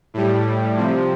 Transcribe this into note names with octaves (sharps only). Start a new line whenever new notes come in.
A2 G3
C3 F3